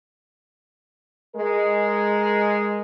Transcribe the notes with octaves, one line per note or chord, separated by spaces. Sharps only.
G#3 A#4